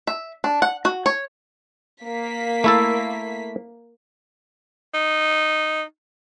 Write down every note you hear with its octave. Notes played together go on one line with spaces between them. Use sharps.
E5
D4
F#5
F#4
C#5
A#3 B6
A3 E4 A4
D#4